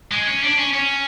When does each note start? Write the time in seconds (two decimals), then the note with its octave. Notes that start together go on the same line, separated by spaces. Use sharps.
0.12 G#3
0.27 C#4
0.43 D4
0.59 C#4
0.74 C#4